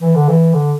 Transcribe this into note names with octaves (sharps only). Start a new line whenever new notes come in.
E3
D3
E3
D3